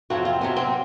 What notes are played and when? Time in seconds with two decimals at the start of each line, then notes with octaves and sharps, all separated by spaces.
0.10 F2 C3 F#3 C4 F#4
0.25 F4
0.41 F2 C3 F#3 C#4
0.56 C4